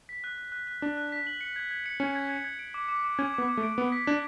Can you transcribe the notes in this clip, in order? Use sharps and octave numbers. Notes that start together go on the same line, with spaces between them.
B6
F#6
F#6
F#6
F#6
D4 F#6
F#6
B6
F#7
C#7
G#6
G#6
C#7
C#4 C#7
G#6
G#6
G#6
D7
D6
D6
D6
C#4 G#6
B3 D6
D6
A3
D7
B3 D7
B6
D4 G#6